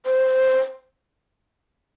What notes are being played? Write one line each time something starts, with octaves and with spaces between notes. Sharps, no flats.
C5